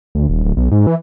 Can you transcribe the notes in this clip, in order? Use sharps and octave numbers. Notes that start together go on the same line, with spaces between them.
D2
D#1
D1
B1
G#2
E3